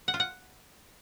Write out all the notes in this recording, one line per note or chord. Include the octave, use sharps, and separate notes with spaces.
F#5
F4
F#5